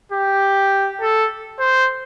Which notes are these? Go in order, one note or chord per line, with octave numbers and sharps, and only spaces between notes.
G4
A4
C5